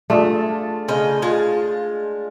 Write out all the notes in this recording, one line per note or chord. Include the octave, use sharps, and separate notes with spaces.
A3 D4 F4 G#4
C#3 C5 D#5 F5
G#3 F4